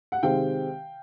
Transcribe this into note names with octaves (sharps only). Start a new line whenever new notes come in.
F#5
C3 D#3 G#3 C4 F5 G5